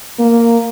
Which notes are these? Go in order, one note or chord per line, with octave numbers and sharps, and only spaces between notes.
A#3